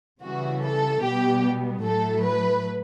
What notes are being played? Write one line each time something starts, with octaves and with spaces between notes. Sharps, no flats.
C#3 E3 G3 F#4
A4
B2 G3 B3 G4
A2 F#3 A3 A4
B4